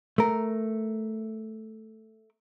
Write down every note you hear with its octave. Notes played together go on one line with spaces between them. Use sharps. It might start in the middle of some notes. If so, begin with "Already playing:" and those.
A3 A#4